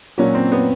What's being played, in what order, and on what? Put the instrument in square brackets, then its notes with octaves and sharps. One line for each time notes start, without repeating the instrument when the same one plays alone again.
[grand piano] A#2 F#3 A#3 D4 F#4 [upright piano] C#4
[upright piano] C4
B3